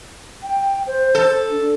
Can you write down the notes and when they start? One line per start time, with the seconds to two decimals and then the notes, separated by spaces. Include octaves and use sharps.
0.43 G5
0.87 C5
1.15 A4
1.50 D4